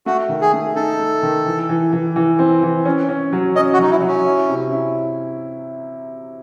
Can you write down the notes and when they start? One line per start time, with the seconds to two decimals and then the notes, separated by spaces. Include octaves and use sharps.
0.06 A3 F#4
0.29 D#3
0.41 G#4
0.53 A3
0.76 D#4 A4
0.99 A3
1.23 D#3
1.46 E3
1.69 E3
1.93 E3
2.16 E3
2.39 C4
2.63 E3
2.85 C#4
3.09 C#4
3.33 F#3
3.56 C#4 D#5
3.73 F#4
3.79 F#3 D#4
3.91 E4
4.02 F#3
4.08 C#4
4.25 E4
4.49 C3
4.72 E4